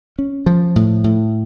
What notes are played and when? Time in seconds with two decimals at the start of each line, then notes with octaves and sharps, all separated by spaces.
0.19 C#4
0.46 F3
0.76 A2
1.04 A2